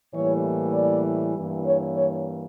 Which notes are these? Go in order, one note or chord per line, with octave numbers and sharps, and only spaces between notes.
A2 E3 G3 A#3 C#5
D5
G2 E3 A#3
C#5
C#5